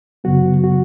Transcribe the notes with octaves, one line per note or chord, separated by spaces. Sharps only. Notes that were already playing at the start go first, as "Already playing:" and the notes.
F#2 C#3 F#3 B3 F#4
F#4